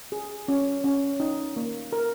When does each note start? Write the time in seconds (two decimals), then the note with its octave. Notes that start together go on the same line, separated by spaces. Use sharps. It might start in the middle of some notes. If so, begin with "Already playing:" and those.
0.12 G#4
0.48 C#4
0.84 C#4
1.20 D#4
1.56 A#3
1.93 A#4